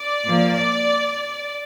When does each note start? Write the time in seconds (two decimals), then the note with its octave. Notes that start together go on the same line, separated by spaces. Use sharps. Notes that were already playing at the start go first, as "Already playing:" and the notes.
Already playing: D5
0.27 A#2 F3 A#3